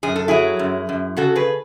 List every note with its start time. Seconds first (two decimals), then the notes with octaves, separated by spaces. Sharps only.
0.03 F#2 G#4
0.16 A4
0.28 F#3 E4 G#4
0.59 F#2
0.89 F#2
1.16 C#3 F#4 A4
1.36 G#4 B4